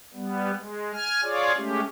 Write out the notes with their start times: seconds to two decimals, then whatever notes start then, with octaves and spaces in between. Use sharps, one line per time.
0.14 G3 B3
0.52 G#3
0.93 G#5 F6
1.23 F4 G#4 C#5 D5
1.56 G#3 A3 C#4 G4